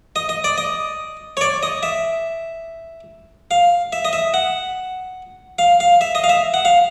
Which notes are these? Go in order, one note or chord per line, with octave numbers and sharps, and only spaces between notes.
D#5
D#5
D5
D#5
C#5
D5
D#5
E5
F5
E5
D#5
E5
F#5
F5
F5
E5
D#5
F5
E5
F#5
F5